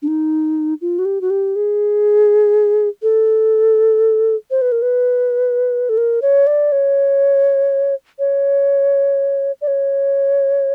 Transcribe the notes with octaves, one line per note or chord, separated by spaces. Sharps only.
D4
D#4
F4
F#4
G4
F#4
G4
G#4
A4
C5
B4
A#4
B4
A4
A#4
C#5
D5
C#5
C#5
D5
C#5